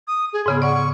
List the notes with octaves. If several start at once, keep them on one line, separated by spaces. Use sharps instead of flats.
D#6
G#4
G#2 C#3 B3 G#4
D5 F#5 C#6